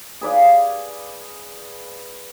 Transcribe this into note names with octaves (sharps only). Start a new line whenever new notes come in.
G#4 B4 D5 F5